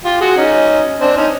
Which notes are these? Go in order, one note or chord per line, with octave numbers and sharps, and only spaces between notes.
F4 G4
F#4 G#4
C#4 D#4
C4 D4
C#4 D#4